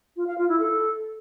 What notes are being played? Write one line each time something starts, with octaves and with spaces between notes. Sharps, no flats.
F4
F5
F4
E4
A4